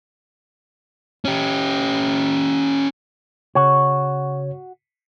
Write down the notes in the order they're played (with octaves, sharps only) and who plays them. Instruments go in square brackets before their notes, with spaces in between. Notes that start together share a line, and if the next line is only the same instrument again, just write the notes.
[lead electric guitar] C#4 G4
[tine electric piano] C#3 C#5 [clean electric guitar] F#4